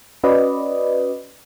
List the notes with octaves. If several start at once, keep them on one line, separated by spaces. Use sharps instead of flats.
C#4 F#4 B4 D5 D#5